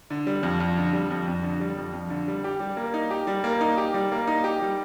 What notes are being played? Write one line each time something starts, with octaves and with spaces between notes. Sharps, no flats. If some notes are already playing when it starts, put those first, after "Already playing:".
D3
G3
F2
F2
D3
G3
F2
F2
D3
G3
F2
F2
D3
G3
G4
G3
A#3
D#4
G4
G3
A#3
D#4
G4
G3
A#3
D#4
G4
G3